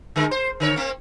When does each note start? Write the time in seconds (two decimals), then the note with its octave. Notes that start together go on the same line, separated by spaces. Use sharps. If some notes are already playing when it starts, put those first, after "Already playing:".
0.16 D3 G#3 A#4
0.31 C5
0.60 D3 A#4 C#5
0.76 A#3 C4